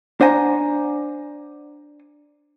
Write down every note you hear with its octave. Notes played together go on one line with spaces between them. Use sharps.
D4 C5 F#5 G#5 A#5